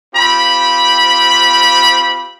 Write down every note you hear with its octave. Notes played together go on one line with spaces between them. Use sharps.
C4 F4 G4 B5